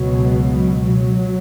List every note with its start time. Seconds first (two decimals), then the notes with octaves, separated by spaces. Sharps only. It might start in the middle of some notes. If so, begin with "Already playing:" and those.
Already playing: C#2 B2 F#3
0.53 F#3